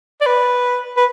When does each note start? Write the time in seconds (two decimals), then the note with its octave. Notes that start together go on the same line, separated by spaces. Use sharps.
0.21 D5
0.26 B4
0.97 B4